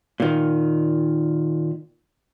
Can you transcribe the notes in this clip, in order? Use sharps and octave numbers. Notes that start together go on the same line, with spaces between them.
A#2 D#3